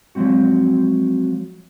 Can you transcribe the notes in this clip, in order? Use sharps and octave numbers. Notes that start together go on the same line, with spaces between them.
F3 F#3 G#3 C4 F#4